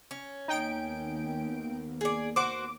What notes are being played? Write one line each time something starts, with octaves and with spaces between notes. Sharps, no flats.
C#4
D#2 A#3 B3 D#4 G5 D7
G#4 D5
F#4 C5 D6